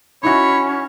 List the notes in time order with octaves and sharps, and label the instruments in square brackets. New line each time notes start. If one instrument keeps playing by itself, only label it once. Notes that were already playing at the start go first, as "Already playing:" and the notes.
[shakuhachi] C#4 [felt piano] D#4 E4 F#4 [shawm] C#5 [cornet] B5